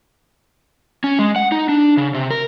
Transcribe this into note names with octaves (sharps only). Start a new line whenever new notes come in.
C#4
G#3
F#5
D#4
D4
C#3
C3
A#4